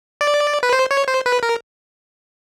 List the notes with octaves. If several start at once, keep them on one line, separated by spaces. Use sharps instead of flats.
D5
B4
C5
C#5
C5
B4
A#4